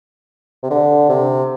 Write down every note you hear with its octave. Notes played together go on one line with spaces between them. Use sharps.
C3
D3
C3